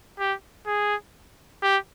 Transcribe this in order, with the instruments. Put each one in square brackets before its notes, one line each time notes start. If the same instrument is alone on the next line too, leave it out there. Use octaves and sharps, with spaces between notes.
[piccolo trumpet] G4
G#4
G4